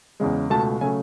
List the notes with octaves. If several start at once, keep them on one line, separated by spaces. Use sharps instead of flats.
E2 C#3 G#3
C#2 B2 A3 A5
C#3 F#3 A3 G#5